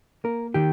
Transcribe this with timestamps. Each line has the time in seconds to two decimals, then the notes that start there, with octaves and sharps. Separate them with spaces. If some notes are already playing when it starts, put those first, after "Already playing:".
0.24 A#3 A#4
0.54 D#3 G4